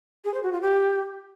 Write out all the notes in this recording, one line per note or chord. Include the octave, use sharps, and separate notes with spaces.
G#4
C5
F#4
F4
G4